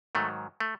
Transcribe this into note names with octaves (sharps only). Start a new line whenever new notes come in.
G#2 D#3 F#3 A3
A3